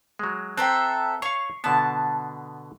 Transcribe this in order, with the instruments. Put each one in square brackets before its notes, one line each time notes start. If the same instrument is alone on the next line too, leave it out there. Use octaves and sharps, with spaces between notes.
[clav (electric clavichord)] F#3 G#3
[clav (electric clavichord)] C4 [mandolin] A4 C5 E5 [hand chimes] G5 A#5 F#6
[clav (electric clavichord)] C#5 F5 [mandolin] C#6 [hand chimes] C7
[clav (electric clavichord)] B2 D3 B3 [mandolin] A5